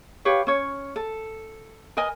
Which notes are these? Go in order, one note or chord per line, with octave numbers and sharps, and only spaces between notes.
G4 B4 C#5 F5
C#4 C#5
A4
A#4 B4 D#5 G#5